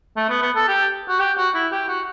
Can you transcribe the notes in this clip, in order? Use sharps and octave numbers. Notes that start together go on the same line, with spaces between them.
A3
B3
B3
A4
G4
F#4
G4
F#4
E4
G4
F#4